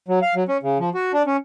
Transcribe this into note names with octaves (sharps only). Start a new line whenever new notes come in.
F#3
F5
F#3
C#4
C#3
F3
F#4
D4
C#4